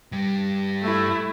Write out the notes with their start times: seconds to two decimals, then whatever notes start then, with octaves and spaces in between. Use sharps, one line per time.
0.12 G2 G3
0.82 A3 E4